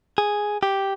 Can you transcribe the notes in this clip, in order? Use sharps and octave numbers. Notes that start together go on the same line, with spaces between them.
G#4
G4